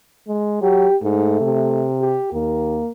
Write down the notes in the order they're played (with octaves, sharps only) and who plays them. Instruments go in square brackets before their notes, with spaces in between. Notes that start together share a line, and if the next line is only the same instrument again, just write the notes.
[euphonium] G#3
[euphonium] F#3 [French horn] G4
[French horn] G#2 [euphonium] A3
[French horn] C3
[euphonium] G4
[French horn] D#2 [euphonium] A#3